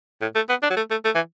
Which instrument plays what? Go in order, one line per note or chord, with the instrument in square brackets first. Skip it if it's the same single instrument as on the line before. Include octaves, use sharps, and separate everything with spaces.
[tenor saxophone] A2
A3
B3
D4
F#3
A3
A3
A3
E3